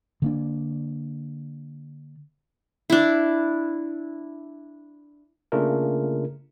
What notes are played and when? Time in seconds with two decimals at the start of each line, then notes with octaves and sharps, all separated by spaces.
0.22 D3 A#3 D4
2.90 D4 E4
5.52 C#3 A3 A#3 D4 F4 A#4